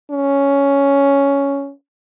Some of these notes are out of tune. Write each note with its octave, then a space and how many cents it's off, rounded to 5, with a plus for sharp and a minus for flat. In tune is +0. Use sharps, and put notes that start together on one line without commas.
C#4 +10